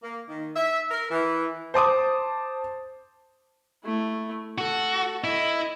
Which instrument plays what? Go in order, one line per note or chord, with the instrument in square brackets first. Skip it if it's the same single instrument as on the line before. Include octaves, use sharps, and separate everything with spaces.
[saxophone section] A#3
D#3
E5
A#4
E3
[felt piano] C5 A5 D6 D#6
[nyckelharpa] A3 E4
[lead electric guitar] F#4 [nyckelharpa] A4
[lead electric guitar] E4 [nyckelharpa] D#5